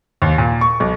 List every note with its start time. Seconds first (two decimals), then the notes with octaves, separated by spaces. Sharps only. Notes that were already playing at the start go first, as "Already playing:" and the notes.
0.22 D#2
0.38 A#2
0.61 C#6
0.80 B1